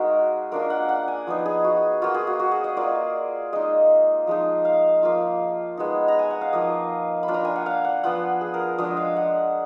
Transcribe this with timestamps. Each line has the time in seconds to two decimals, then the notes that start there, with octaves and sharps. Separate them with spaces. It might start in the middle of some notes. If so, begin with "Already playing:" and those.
Already playing: G#3 A#3 D#4 F#4 G#4 A#4
0.51 A#3 D4 F4 A#4
0.70 F#5
0.89 F#5
1.08 G#5
1.27 F3 B3 D#4
1.46 G#4
1.64 F#4
2.02 A#3 F4 F#4
2.14 G#4
2.27 F#4
2.39 F#4
2.52 G#4
2.64 D#5
2.77 A#3 F4 D5
3.53 G#3 D#4 D#5
4.27 F3 G#3 D#4
4.65 F5
5.03 F3 A#3 F4
5.77 G#3 B3 D#4
6.08 A#5
6.19 G#5
6.30 F#5
6.41 F5
6.53 F3 A#3 D#4 D#5
7.23 B5
7.28 A#3 D4 F4
7.34 A#5
7.45 G#5
7.56 F#5
7.66 F5
7.84 F#5
8.03 F3 B3 F4 F#5
8.41 G#4
8.54 A#4
8.78 F3 G#3 D4 D#5
8.97 F5
9.16 F#5